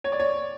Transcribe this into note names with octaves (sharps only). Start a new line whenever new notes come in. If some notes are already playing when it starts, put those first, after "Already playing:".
C#5
D5
C#5